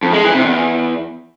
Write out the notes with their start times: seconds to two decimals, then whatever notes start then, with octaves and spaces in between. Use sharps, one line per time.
0.03 F2
0.13 G#3
0.24 E3
0.34 C3
0.45 E2